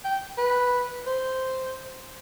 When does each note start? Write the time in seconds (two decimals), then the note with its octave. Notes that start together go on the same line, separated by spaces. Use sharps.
0.05 G5
0.38 B4
1.07 C5